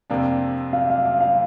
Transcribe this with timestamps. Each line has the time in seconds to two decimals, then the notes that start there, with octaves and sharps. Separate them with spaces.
0.10 F2 C3 A#3 D4
0.73 F5
0.90 F5
1.05 F5
1.20 F5